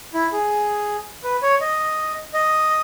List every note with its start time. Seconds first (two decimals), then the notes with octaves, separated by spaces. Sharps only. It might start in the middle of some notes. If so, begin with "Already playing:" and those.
0.14 E4
0.32 G#4
1.24 B4
1.42 C#5
1.61 D#5
2.34 D#5